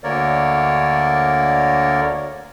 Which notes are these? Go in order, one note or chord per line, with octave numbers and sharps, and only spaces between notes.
D2 D3 A#3 A#4 C#5 D5